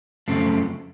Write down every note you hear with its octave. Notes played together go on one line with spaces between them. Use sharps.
F#2 C#3 F3 A3 C4